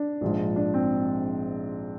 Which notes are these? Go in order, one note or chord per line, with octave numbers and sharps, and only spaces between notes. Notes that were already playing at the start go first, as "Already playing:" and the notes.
Already playing: D4
A#1 G#2 F3
D4
C4